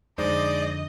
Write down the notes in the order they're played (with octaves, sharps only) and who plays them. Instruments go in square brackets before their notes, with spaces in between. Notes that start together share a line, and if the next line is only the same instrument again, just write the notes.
[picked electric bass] F2 D3 [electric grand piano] G#3 D#4 C5 [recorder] D5 [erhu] D#5